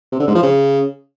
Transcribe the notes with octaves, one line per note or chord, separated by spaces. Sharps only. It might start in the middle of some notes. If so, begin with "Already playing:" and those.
C3
D3
G#2
F3
C#3